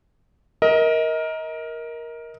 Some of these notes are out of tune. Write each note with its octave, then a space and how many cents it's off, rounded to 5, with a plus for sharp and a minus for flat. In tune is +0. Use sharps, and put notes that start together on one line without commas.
A#4 +10 D#5 +30